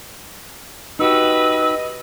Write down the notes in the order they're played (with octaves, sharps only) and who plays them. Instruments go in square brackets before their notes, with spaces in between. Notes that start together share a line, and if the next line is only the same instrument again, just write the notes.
[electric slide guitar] D#4 F#4 G4 [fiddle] B4 [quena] D#5 [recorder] E6